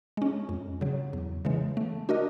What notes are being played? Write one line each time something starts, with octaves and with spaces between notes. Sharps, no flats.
G#3 C#4
F2
C#3 F#3
E2
C#3 E3 G#3
A3
D4 F#4 A#4 D#5